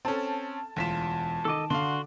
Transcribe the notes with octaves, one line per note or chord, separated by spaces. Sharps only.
C4 C#4 A4 A5
E1 D2 F4 A5 B6 E7
D#3 A4 D#5 D6
D3 D4 F#4 F5 C6